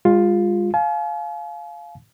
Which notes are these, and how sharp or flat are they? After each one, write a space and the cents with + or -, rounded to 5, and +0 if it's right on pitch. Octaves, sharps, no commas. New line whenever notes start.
G#3 -40 F4 +10
F5 +0 G#5 +45